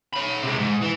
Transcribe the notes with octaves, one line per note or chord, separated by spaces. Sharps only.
C#5 B5
C3 G#3
G#2
E3